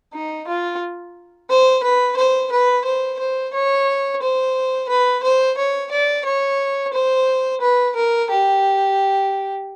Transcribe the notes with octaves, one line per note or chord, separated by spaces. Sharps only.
D#4
F4
C5
B4
C5
B4
C5
C5
C#5
C5
B4
C5
C#5
D5
C#5
C5
B4
A#4
G4